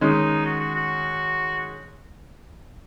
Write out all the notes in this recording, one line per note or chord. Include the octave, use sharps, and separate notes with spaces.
D#3 G#3 C#4 D#4
F#4
F#4
F#4